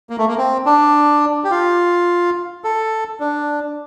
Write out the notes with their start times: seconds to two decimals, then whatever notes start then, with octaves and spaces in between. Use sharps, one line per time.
0.10 A#3
0.18 A3
0.28 A#3
0.38 C4
0.66 D4
1.44 G4
1.51 F4
2.64 A4
3.20 D4